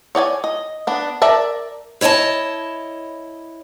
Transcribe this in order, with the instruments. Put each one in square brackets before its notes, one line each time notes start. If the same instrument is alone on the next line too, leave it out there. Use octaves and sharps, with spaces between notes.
[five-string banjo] C#5 D5 G5 G#5
D#5
B3 D4
A#4 D5 E5 A5
[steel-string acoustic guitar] E4 C#5 D#5 G#5 A5